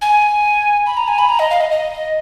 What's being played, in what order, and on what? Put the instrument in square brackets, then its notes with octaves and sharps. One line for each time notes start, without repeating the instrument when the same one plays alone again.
[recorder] G#5
B5
A#5
G#5
B5
A#5
D#5
F5
D#5
D#5